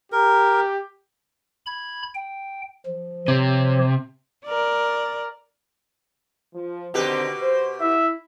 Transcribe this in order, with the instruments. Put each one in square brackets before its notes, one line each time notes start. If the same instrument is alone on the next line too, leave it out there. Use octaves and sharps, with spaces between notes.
[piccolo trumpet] G4 [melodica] A#4
[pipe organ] B5 G#6
G5
F3
[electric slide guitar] C3 [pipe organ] F3 G4 C#5
[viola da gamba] A#4 D5
[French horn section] F3
[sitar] B2 G4 B4 [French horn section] D3 D#3 C4
[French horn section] C5
[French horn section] E4 [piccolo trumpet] E5